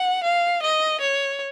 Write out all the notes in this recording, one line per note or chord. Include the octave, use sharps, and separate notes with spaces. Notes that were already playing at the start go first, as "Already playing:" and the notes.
Already playing: F#5
F5
D#5
C#5